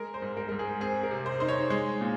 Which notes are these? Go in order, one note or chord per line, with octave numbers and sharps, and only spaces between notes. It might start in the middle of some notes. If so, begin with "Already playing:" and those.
Already playing: G#3 A#4
C5
G#2
A#4
G#2 A#4
G#4
C4 G#4
A#4
C3
C5
D#4 C5
C#5
G#3
A#2